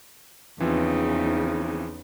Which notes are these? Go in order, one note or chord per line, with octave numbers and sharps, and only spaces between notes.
E2 C#3 E3 F3 C4 D#4